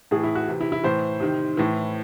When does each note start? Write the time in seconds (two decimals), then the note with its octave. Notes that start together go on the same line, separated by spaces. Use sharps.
0.11 A2 E3 G#4
0.24 E4
0.35 F#4
0.48 C3 E3
0.61 E4
0.72 E4
0.84 A2 E3 C5
1.20 C3 D#3
1.57 A2 E3